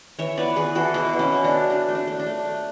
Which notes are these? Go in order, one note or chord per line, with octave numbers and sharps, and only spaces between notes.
E3 C#5 E5
B3 B4 D5
E3 G#4 B4
E3 F#4 A4
B2 E4 G#4
B2
C#4 E4
F#3
D4
B3
A3 D4
A3
D4
A3
D4
A3
A3